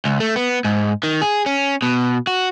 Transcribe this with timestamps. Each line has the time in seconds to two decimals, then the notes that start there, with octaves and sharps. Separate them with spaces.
0.05 C#2
0.20 A3
0.36 B3
0.65 G#2
1.03 D#3
1.22 G#4
1.46 C#4
1.82 B2
2.27 F#4